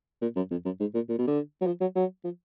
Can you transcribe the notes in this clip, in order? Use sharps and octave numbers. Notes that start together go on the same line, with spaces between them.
A#2
F#2
F2
F#2
G#2
A#2
A#2
B2
D3
F#3
F3
F#3
F#3
F3